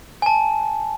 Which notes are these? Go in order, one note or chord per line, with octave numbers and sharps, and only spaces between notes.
G#5 A5